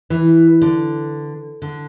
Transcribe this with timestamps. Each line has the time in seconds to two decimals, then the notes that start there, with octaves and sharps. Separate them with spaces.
0.10 E3
0.62 D3
1.62 D3